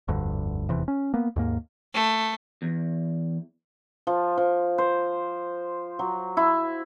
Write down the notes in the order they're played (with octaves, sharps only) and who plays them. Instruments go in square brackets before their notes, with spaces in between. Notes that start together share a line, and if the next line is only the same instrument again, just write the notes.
[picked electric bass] F1 D2 G2 D3
F1 E2 C3 E3
C#4
A#3 B3
D#2 G#2 A#3
[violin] A3
[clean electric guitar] E2
[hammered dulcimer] F3
F3
C5
F#3
E4